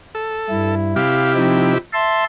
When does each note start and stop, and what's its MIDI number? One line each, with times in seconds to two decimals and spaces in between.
0.15 0.75 69
0.50 0.94 43
0.50 0.94 64
0.96 1.78 48
0.96 1.78 64
0.96 1.78 67
0.96 1.31 77
1.35 1.73 53
1.35 1.73 60
1.35 1.73 63
1.93 2.24 76
1.93 2.24 81
1.93 2.24 84